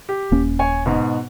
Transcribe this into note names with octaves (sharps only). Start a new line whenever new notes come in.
G4
D#1 A#3 C#4
C#5 G#5
G#2 B2